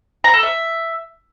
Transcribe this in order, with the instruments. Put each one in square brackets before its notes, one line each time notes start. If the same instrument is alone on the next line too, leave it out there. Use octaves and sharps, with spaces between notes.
[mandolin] A#5
A4
E5